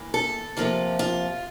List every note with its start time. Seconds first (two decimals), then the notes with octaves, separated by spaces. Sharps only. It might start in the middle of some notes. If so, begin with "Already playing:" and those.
Already playing: E3 A#3
0.14 A4
0.57 C3 F3 A#3 F4
0.99 F4